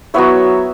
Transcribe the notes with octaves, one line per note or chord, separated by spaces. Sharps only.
F#3 B3 E4 C#5 E5